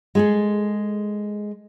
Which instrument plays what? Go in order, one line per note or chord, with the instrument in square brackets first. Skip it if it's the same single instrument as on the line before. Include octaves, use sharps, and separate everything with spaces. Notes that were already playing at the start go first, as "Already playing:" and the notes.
[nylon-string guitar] G#3 G#4 A4